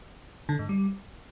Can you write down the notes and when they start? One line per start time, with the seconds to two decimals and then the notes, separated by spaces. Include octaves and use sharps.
0.49 D3
0.59 G#2
0.69 G3